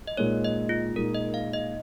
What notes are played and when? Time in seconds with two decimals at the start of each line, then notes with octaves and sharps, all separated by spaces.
0.07 D#5
0.17 A#2 G#3 D#4 C#5
0.44 D#5
0.69 F4
0.96 A#2 G#3 D#4 A#4
1.14 D#5
1.34 F5
1.53 D#5